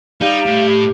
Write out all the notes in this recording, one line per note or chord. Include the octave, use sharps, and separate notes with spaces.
G3 D#4 F5
A2